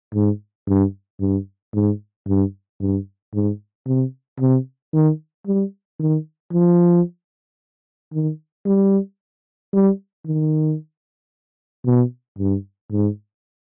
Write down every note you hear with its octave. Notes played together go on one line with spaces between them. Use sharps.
G#2
G2
G2
G#2
G2
G2
G#2
C3
C3
D#3
G3
D#3
F3
D#3
G3
G3
D#3
B2
G2
G#2